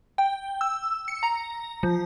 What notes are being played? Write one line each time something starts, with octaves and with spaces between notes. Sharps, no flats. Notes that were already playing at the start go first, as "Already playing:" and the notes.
G5
E6
C#7
A#5
F3